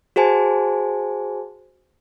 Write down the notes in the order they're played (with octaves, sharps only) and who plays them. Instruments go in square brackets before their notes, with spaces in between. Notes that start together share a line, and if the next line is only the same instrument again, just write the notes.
[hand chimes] F#4 G#4 C5 G#5 A5